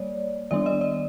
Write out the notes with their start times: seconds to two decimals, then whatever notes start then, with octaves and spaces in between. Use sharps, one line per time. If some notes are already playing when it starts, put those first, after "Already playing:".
Already playing: G3 A#3 C#5 D5
0.51 D#3 G3 B3 D4 D5
0.66 D#5
0.81 D5